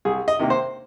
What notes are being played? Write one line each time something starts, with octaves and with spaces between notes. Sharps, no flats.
C2 G#4
D#5
C3 D#3 A#3
C5